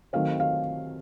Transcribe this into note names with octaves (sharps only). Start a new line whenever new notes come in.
D#3 F#3 A3 C4 F5
F5